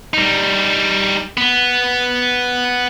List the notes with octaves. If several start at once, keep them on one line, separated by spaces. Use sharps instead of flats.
G3 D#4
B3